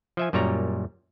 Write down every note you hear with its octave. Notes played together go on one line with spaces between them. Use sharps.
F3 E5 G#5
F#2 A#2 G3 C#5 A#5